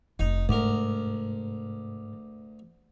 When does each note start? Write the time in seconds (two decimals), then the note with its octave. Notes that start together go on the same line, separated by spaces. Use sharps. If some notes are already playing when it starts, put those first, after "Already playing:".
0.19 F1 C4 D#4
0.49 D2 G#2 C3 A#4